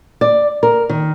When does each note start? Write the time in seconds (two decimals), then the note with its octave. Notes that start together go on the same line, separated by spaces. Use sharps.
0.21 D5
0.63 A#4
0.89 D#3